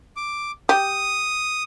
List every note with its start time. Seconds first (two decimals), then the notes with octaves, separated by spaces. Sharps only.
0.17 D6
0.69 G4 D#6